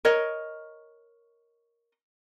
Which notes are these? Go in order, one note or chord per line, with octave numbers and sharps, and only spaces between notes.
A#4 C#5 D#5